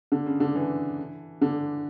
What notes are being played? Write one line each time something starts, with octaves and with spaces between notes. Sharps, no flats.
D3
C#3
D3
E3
D3